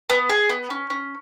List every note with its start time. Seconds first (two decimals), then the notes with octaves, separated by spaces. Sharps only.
0.10 B3
0.30 G#4
0.49 B3
0.70 C#4
0.90 C#4